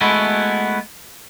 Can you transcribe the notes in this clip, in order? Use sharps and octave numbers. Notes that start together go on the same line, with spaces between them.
G#3 A3 B3 E4 F#4